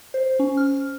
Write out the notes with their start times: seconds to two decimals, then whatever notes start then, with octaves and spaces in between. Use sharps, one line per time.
0.14 C5
0.39 C#4
0.57 F6